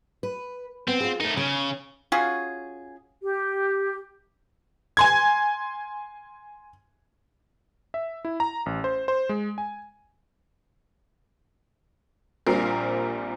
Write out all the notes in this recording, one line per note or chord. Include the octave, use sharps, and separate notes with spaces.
B4
B3 C4
F4 G#4
A3 D#4 A#4
C#3 C#4
C#4 F4 F#4 G#4
G4
G#5 C6 G#6
E5
E4
A#5
A1
C5
C5
G#3
G#5
A#1 A#2 G3 C4 A#4 C7